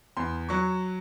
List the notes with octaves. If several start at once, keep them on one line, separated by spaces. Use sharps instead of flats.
E2 C6
F#3 C#6